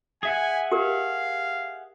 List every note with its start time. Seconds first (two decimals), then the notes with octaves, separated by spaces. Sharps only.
0.23 G#4 E5 F#5 G#5
0.72 G4 A#4 F5